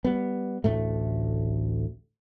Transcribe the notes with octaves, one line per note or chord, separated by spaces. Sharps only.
G3 B3
A1 D2 A2 A3